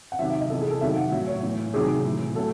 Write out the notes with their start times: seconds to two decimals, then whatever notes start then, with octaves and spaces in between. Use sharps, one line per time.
0.12 F#5
0.19 C3 D#3 F#3 E5
0.30 E5
0.40 D#5
0.50 C3 E3 A4
0.61 G#4
0.71 A4
0.81 C3 D#3 F#3 E5
0.96 F#5
1.12 A2 F#3 E5
1.27 C#5
1.43 A2 E3
1.74 C3 D#3 F#3 G#4
2.04 A2 E3
2.35 A2 F#3 A4